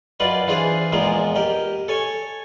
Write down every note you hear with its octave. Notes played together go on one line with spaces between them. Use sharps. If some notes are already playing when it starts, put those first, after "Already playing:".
F#2 F4 B4 D5 D#5
E3 D4 F4 G#4 C5
E2 A#2 F3 G#3 G#4 A#5
G4 A#4 D#5
A4 C#5 G#5